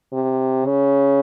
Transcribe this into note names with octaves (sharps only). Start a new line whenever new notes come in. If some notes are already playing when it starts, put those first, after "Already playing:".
C3
C#3